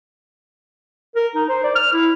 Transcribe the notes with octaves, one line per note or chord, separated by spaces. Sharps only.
A#4
D#4
C5
D5
F6
E4